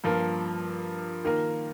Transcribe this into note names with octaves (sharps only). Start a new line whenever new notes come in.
G2 F3 A#3 F4 A#4
D#3 A#3 F4 A#4